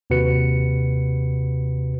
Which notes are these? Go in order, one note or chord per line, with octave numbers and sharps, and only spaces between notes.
D#2 C3 F#4 B4 C#7